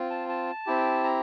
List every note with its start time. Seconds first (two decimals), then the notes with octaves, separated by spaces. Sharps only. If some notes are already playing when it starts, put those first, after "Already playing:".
Already playing: C4 F4
0.10 A5
0.29 A5
0.66 C4 E4 G4
1.04 A#5